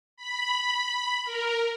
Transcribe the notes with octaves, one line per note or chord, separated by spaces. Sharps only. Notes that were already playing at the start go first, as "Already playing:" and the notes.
B5
A#4